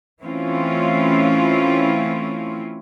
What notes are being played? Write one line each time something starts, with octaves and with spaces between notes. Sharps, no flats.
E3 A3 C4 C#4 E4 F4